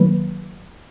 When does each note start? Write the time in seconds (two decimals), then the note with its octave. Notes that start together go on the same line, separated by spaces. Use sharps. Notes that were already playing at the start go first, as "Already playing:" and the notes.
Already playing: D#3 F#3 A#3 B4